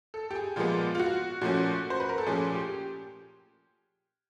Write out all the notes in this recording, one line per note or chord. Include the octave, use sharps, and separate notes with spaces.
A4
G4
G#4
A#2 F3 G#3 B3 F4
F4
F#4
A#2 F3 A3 C#4 F#4
C5
B4
A#4
A4
A#2 F3 A3 C#4 G#4
G4